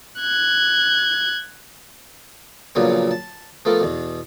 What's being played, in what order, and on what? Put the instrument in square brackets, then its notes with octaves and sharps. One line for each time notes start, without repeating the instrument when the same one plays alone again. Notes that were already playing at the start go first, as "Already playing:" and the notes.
[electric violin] F#6 G#6
[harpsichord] A#1 A#2 C#3 F#3 B3
A5
F3 A3 B3 A4 A#4
E2 B2